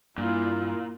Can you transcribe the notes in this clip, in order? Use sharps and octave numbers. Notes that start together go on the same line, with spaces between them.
G2 A#2 E4 F4